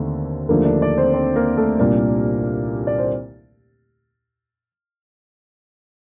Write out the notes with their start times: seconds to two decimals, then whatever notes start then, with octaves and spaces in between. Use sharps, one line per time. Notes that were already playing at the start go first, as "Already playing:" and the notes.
Already playing: D#2 D3 A3 A#3 C4
0.49 D#2 D3 F3 A3 A#3 D4 A#4
0.65 D4 D5
0.81 D4 D5
0.98 C4 C5
1.14 C4 C5
1.36 A#3 A#4
1.57 A3 A4
1.79 C2 A#2 G3 A#3 D4 A#4
2.87 D5
2.98 C5